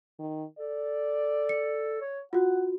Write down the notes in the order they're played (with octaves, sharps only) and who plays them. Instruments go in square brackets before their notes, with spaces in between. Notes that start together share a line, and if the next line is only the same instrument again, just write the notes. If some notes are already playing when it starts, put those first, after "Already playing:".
[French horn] D#3
[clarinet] A4 [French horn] D5
[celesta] C#7
[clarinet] C#5
[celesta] F4 F#4 [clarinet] F#5